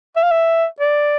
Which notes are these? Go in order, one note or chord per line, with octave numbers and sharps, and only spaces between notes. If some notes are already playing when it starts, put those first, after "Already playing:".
E5
F5
E5
D5